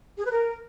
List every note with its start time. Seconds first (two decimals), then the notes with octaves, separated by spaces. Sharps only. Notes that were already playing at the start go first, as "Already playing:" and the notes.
0.17 G#4
0.24 B4
0.31 A#4